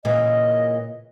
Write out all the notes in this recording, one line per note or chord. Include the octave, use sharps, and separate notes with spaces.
A#2 C#3 E3 D#5